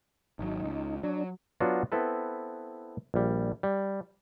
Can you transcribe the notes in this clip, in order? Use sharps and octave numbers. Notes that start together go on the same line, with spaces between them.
G#1 F#3 D#4
C#2
F#3 D4
F#3 B3 D4 F4 F#4
B3 C4 E4 A4 B4
A#1 G3
G3